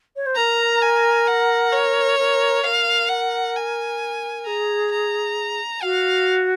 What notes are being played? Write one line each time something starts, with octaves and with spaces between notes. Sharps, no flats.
C#5
C5
A#4 A#5
G#5
F#5
C#5
A#4
A#4 F5
F#5
G#5
G#4 A#5
A#5
F#4 F5